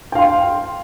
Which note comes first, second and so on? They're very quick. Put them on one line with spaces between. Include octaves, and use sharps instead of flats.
G5 F5 C6